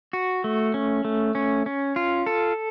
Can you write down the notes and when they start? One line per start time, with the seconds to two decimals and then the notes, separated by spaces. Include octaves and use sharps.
0.13 F#4
0.44 A3
0.74 C#4
1.05 A3
1.35 C#4
1.66 C#4
1.96 F4
2.26 A4